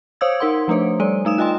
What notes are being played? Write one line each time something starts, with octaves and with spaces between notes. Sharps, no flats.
C5 C#5 F5 D#6 E6 G#6
D#4 A#4 F#5 C6
F3 A3 D4 C5 C#5
G3 C#5 D5
A3 D#4 D#6 E7
F4 D#5 G5 G#5 C6